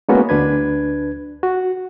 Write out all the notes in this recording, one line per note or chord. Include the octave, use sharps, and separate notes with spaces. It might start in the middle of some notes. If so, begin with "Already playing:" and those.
G#3 A#3 B3 C#4 E4 F#4
D2 D4 B4 G#6
F#4